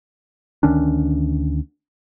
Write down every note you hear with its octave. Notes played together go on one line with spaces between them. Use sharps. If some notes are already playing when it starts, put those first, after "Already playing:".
D2 D#3 C#4 D4